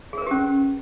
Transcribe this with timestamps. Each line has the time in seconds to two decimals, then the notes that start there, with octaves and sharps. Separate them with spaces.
0.13 G#4
0.18 A#4
0.22 B4
0.27 G4
0.31 C#4